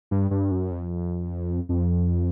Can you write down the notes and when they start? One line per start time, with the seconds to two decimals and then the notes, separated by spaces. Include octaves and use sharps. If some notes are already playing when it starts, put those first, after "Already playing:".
0.11 G2
0.31 G2
0.51 F#2
0.71 F2
1.69 F2